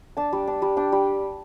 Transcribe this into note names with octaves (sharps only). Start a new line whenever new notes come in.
D4 A5
G3
D4
G3
D4 G5
G3